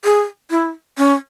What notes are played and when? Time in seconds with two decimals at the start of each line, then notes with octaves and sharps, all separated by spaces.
0.05 G#4
0.51 E4
0.98 C#4